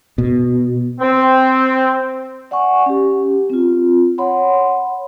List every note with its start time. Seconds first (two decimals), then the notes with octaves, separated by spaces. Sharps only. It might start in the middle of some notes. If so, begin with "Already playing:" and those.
0.18 B2
1.00 C4
2.51 D5 F#5 G#5 C#6
2.86 C#4 G4
3.50 C4 F4
4.18 C#5 F#5 B5 C6